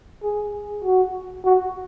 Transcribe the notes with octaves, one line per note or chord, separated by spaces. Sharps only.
G#4
F#4
F#4